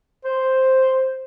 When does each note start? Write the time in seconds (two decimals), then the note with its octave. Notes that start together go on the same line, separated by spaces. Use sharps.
0.25 C5